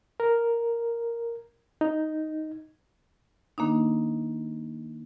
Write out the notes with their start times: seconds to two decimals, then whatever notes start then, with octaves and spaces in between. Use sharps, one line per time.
0.20 A#4
1.81 D#4
3.58 D#3 A#3 D4 D#4